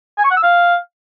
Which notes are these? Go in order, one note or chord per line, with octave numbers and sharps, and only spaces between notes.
G#5
C#6
F#5
E6
F5